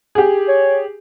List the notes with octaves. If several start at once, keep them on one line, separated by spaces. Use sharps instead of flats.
G4 G#4
C#5